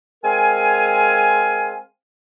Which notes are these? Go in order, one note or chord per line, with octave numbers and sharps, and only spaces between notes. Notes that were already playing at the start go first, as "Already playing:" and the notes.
G#3 C4 A#4 F5 G#5